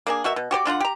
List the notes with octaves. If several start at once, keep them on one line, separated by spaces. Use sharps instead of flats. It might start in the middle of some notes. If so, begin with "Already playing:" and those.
A#3 D4 G#4
B2 F#4 A#4 E5
B2
F#4 G4 C5 D5
D3 D4 F4 F#5
G4 A#5